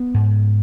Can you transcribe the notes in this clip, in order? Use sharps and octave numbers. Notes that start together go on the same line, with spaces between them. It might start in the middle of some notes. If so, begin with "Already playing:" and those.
Already playing: B3
G#2